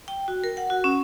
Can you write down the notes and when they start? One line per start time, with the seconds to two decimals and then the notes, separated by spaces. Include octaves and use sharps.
0.08 G5
0.28 F#4
0.44 A#4
0.57 F#5
0.70 F#4
0.84 C#4